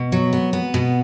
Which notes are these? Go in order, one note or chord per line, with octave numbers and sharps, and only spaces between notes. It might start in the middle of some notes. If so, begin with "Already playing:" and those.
Already playing: B2
F#3
B3
B3
B2